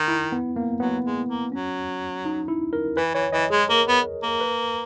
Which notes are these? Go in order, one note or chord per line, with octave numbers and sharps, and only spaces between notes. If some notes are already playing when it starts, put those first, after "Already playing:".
Already playing: D#3
E4
B3
A#3
F#3 B3
G#3
A#3
F#3 C#4
D#4
E4
A#4
E3 B4
E3 C#5
E3 D#5
G#3 G#4
A#3 A#4
B3
A#3
B4